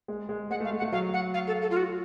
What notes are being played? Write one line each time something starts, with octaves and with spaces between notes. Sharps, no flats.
G#3
G#3
G#3 F#5
A3
F5
A3
F#5
A3
F#3 F5
F#5
F5
A4
A4
F4
F#4